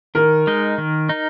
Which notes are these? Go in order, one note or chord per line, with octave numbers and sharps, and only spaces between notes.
D#3 A#4
G#3 D#4
D#3
D#4